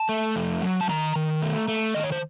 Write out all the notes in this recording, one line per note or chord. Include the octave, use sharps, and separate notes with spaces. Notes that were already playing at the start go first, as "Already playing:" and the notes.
Already playing: A5
A3
F2
F#3
A5
D#3 A#5
D#3
A3
A3
D#3 D#5
C#5
C5